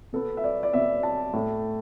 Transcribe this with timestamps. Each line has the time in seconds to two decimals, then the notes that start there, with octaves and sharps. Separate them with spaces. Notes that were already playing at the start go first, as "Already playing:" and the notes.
0.13 B2 B3 A4
0.37 E5
0.44 D5
0.63 D5
0.73 B2 B3 E5
1.03 A5
1.33 A2 A3